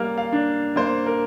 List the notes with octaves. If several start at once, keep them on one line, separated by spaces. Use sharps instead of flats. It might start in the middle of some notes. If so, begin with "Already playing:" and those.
Already playing: G3 A#3 F6
F5
D4
A#3 C5
A#4